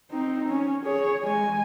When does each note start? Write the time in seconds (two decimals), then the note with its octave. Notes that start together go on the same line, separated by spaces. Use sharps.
0.11 C4 D#4
0.49 C#4
0.85 G#4 C#5
1.22 G#3 G#5